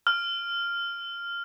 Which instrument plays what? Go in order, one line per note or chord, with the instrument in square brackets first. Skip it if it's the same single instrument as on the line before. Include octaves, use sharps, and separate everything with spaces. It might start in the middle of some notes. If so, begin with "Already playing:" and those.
[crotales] F6